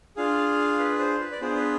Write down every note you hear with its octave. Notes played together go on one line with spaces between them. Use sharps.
D4 F4 G#4 F5
B4
C5
B4
D5
B3 D4 F4 G#4 C5
B4